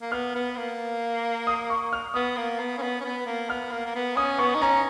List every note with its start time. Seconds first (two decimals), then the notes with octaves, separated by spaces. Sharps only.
0.02 A#3
0.12 B3 F6
0.35 B3
0.57 A#3
1.47 D#6
1.70 C#6
1.93 F6
2.14 B3 D#6
2.37 A#3
2.59 B3
2.78 C#4
2.82 B3
3.00 C#4
3.04 B3
3.26 A#3
3.50 B3 F6
3.72 A#3
3.86 A#3
3.95 B3
4.17 C#4 D#6
4.39 B3 C#6
4.55 D#4
4.62 C#4 A#5